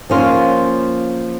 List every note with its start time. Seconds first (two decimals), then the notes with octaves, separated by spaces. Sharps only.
0.10 F3 A#3 C#4 F4